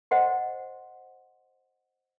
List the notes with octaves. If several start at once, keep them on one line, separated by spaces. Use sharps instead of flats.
C5 D#5 F#5 G5 C6